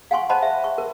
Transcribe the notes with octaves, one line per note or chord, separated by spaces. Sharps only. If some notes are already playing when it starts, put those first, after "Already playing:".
F5 F#5 G#5 C6 C#6
C5 D#5 F#5 A5 B5 C6
E5
C#6
A#4